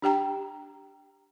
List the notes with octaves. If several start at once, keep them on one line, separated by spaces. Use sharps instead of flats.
D4 G4 G5 A#5